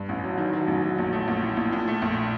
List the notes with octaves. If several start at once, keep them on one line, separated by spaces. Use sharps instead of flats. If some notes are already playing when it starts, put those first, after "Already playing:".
Already playing: G2
A1
F#3
D#3
F#3
A1
F#3
A#1
A3
A#1
A2
A#1
A#2
A3
A#1